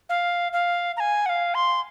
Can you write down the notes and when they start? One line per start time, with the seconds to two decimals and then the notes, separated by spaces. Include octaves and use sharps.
0.09 F5
0.53 F5
0.97 A#5
1.00 G#5
1.26 F#5
1.29 F5
1.55 C6